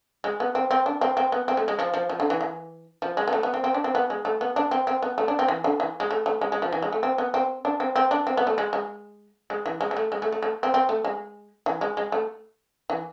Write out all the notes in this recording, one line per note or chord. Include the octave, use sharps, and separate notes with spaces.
G#3
B3
C4
C4
D4
C4
C4
B3
C4
A3
G#3
F3
F3
F3
D3
E3
E3
F3
G#3
B3
A3
B3
C4
C4
D4
C4
B3
G#3
A3
B3
D4
C4
C4
B3
A3
D4
C4
E3
D3
E3
G#3
A3
A3
G#3
G#3
F3
E3
G#3
A3
C4
B3
C4
D4
C4
C4
D4
C4
B3
A3
G#3
G#3
G#3
E3
G#3
G#3
A3
G#3
A3
A3
A3
C4
C4
A3
G#3
E3
G#3
G#3
A3
E3